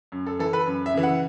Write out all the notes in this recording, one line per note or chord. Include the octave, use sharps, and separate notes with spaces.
F#2
A4
E3 A4
B4
F#2
E5
C#3 E3
F#5